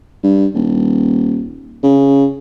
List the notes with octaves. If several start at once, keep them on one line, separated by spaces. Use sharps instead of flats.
G2
D#1
C#3